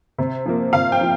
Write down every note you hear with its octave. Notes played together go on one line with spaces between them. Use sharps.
C3
F3 A#3
C3 F5
G5
F3